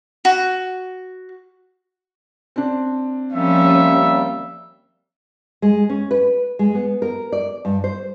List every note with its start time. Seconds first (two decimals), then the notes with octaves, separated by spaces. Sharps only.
0.25 F#4
2.56 C4 D4
3.33 D#2 F3 G3 A#3 C#4 E5
5.62 G#3
5.89 C#4
6.11 B4
6.59 G#3
6.75 B3
7.02 A#4
7.32 D5
7.65 G2
7.84 C5